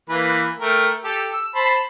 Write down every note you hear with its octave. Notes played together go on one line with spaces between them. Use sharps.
E3 A#3 B4
A3 A#4 G5
G4 A4
E6
C5 A5 B5